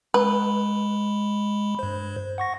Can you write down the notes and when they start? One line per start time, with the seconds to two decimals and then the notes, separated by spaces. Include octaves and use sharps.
0.14 G#3 B4 B5
1.79 G2 C5
2.38 F#5 C#6 A#6